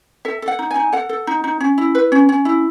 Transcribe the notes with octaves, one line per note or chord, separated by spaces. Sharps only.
A4 E5
A4
F#5
D#4
G#5
D#4
A4 F#5
A4
D#4
D#4
C#4
E4
B4
C#4
C#4
E4